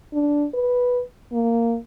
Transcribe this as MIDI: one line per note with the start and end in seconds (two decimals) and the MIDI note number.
0.13 0.46 62
0.54 1.02 71
1.33 1.77 58